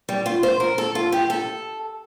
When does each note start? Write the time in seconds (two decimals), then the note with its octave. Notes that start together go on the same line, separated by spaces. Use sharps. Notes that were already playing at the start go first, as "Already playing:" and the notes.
0.09 G3
0.26 F4
0.43 C5
0.60 A#4
0.78 A4
0.95 F4
1.12 G4
1.30 A4